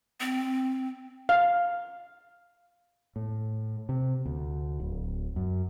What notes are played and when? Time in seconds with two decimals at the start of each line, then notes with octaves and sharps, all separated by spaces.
0.20 C4
1.29 F5
3.16 A2
3.89 C3
4.26 D2
4.80 D1
5.36 F#2